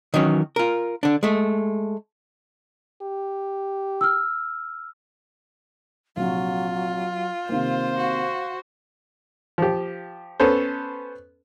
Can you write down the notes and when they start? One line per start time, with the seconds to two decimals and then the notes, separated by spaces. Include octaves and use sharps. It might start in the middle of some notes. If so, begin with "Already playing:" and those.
0.14 D#3 E3 F#3 C#4
0.56 F4 A#4
1.03 D3 D4
1.23 G#3 A3
3.02 G4
4.01 E6 F6
6.17 A#1 C3 F#3 F4
7.49 C3 D#3 A#3 C5 F5
7.98 F#4
9.58 F3 G4
10.40 B3 C#4 A4 C5